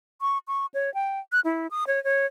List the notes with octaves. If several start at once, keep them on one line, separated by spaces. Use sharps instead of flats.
C#6
C#6
C#5
G5
F#6
E4
D#6
C#5
C#5